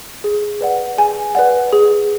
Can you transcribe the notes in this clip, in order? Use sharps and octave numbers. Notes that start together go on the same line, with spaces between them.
G#4
B4 D5 F#5
G#4 G#5
B4 D5 F#5
G#4